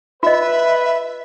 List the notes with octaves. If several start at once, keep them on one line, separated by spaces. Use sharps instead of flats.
F4 B4 D#5 E5